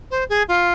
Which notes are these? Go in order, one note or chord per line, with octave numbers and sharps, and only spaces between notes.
C5
G#4
F4